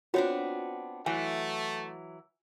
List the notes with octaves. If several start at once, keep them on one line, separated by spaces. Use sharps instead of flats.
B3 C4 D4 F4 F#4 C#5
E3 F#3 A3 G#5